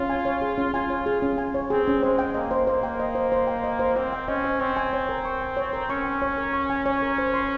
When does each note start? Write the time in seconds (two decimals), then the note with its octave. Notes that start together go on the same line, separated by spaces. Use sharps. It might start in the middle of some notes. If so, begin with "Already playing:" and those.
Already playing: C#4 F4
0.10 G#5
0.25 C#5
0.42 G#4
0.58 C#4
0.74 F4 G#5
0.90 C#5
1.06 F4 G#4
1.22 C#4
1.38 G#5
1.54 C#5
1.70 C4 G#4
1.87 C#4
2.03 G#3 C5
2.19 G5
2.34 A#3 D#5
2.51 C5
2.67 A#3 C5
2.83 G5
3.00 D#5
3.15 C5
3.32 C5
3.47 G5
3.64 D#5
3.79 C5
3.96 C4 C5
4.13 G5
4.28 C#4 D#5
4.44 C5
4.60 C4 C#6
4.77 G#5
4.93 C#5
5.09 A#4
5.25 C#6
5.41 G#5
5.57 C#5
5.73 A#4
5.90 C#4 C#6
6.05 G#5
6.22 C#5
6.38 A#4
6.54 C#6
6.70 G#5
6.86 C#5
7.02 A#4
7.18 C5
7.34 C6